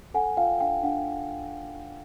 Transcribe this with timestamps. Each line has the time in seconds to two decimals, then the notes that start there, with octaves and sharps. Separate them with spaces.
0.14 A4 F#5 G#5
0.37 F4 F5 G5
0.60 D4 F5 G5
0.83 D4 F#5